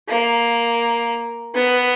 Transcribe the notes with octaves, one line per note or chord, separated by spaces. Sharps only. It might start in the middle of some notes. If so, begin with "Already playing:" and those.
A#3
B3